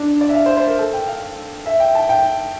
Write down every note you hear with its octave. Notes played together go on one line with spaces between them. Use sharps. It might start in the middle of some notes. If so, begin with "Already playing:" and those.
Already playing: D4
D5
E5
F5
C5
C5
A#4
A4
G5
F5
E5
G5
A5
G5